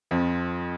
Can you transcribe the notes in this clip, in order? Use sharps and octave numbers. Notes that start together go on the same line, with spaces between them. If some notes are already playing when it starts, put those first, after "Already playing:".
F2 F3